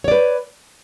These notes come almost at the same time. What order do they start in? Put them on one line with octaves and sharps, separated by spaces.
C#5 D5 B4